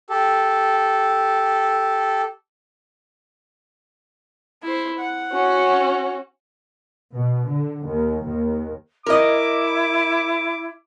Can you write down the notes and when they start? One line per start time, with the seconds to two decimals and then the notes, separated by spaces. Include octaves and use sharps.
0.10 G4 A4
4.63 E4 C5
4.99 F#5
5.33 C#4 F#4
7.15 B2
7.49 D3
7.86 D#2
8.25 D#2
9.06 E4 A#4 D#5 D6